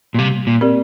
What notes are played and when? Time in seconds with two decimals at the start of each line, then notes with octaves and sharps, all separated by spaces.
0.14 A#2
0.19 C3 G3
0.47 A#2
0.61 C4 G4 A#4 D5